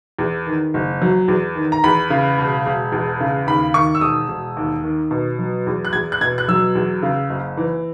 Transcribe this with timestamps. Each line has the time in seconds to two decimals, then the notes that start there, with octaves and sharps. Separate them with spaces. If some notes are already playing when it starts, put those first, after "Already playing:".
0.19 E2
0.47 D#3
0.74 F#1
1.02 F#3
1.28 E2
1.55 D#3
1.72 A#5
1.84 E2 B5
2.10 C#3
2.38 E1
2.66 E1
2.92 E2
3.21 C#3
3.47 D#2 B5
3.74 D#3 C#6
3.95 E6
4.01 E1 D#6
4.29 E1
4.57 D#2
4.84 D#3
5.11 B2
5.39 F#3
5.67 E2
5.85 F#6
5.93 E2 G#6
6.12 F#6
6.21 B2 G#6
6.38 F#6
6.48 F#3 E6
6.75 E2
7.03 C#3
7.30 F#1
7.57 E3